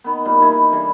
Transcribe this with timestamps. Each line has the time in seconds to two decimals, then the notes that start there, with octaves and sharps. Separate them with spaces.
0.04 D#3 B3
0.25 A#2 G3
0.40 E3 D#4 E4 B4
0.72 D3 E3 G3